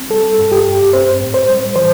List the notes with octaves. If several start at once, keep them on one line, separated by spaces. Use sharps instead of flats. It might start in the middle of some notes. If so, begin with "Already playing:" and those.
Already playing: C4
G3 A4
G2
G4
G2
C4 C5
A2
C5
G3
E3 C5